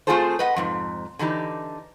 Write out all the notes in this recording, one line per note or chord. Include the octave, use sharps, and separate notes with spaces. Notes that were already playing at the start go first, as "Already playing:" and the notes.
A3 C4 F4 G#4 A4 C5
B4 D#5 F#5
F2 G#2 C3
D3 E3 D#4 G4